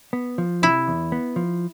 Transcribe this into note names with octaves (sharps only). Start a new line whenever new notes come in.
B3
F3
C3 E4
E2
B3
F3